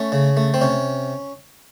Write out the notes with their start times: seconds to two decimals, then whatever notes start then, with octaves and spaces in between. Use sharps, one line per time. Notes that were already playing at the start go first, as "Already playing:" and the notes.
Already playing: A3 C#4
0.12 C#3
0.37 A3
0.54 C4
0.61 C3 C#4